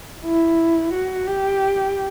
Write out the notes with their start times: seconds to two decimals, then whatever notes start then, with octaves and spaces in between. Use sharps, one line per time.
0.26 E4
0.93 F#4
1.27 G4